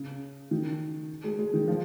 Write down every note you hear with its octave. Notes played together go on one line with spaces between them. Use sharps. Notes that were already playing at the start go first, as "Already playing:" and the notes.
Already playing: C#3
D#3
G#3
G#3
D#3
F3